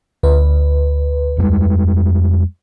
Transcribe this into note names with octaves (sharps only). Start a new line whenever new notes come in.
D2 B4
F2 G3 G#3